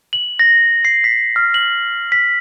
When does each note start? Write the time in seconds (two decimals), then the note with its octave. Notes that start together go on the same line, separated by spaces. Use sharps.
0.13 F#7
0.39 A#6
0.85 C7
1.04 B6
1.36 F6
1.54 F#7
2.12 B6